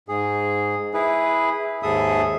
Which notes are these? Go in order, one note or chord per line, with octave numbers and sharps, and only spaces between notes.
G#2 G#4
E4 G#4 B4
D#2 G#2 G#4 A4 E5 D#6